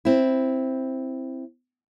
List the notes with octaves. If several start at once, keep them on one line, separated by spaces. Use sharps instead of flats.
C4 E4